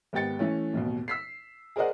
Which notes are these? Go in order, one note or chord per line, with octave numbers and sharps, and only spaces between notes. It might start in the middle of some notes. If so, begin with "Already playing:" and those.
G#1 B3 G4 G5 A6 C#7
E3 A3 C#4
A1 D#2 B2
E6 B6 C7
G#4 A#4 C5 D5 D#5 F#5